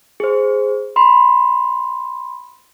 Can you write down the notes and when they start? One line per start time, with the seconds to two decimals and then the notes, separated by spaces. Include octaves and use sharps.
0.20 G#4 C5
0.96 B5 C6